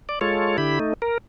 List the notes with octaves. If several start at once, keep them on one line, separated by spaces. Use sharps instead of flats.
D5
G#3 F4 A4 C#5
D3 E4 G4 B5
A3 D#4
A#4